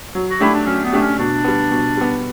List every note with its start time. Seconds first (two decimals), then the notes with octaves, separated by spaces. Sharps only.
0.15 F#3
0.30 F#4
0.40 A3 D4 E4 G4
0.55 D4
0.66 F#3 C#4
0.84 B3
0.93 A3 D4 G4
1.02 C#4
1.19 B2 D4
1.44 G3 B3
1.71 B2
1.97 G3 B3